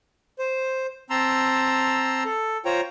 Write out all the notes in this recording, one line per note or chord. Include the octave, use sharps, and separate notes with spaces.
C5
C4 A5 A#5 C6 E6
A4
F4 C5 C#5 G5 A#5